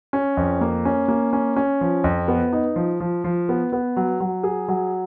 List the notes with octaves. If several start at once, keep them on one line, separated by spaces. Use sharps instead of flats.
C#4
F2
A#3
C#4
A#3
C#4
C#4
F3
F2
B3
D#4
F3
F3
F3
B3
B3
F#3
F#3
G#4
F#3